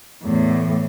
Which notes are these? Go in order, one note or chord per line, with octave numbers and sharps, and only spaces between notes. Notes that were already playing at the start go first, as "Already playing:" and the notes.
E2 A2